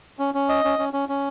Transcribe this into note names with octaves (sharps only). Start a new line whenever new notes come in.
C#4
C#4
D#5
C#4
C#4
C#4
C#4